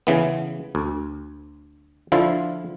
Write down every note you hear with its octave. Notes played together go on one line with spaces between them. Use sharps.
C#3 E3 B3
D2
D3 F3 E4 F4